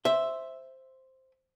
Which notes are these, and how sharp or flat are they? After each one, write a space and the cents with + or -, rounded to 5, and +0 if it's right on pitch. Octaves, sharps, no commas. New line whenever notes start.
C5 +0 E5 +0